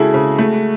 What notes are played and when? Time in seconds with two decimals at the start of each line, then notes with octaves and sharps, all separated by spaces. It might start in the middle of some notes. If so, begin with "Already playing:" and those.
Already playing: C#3 G#3 E4 F#4 G#4 A4
0.14 C#3
0.39 A3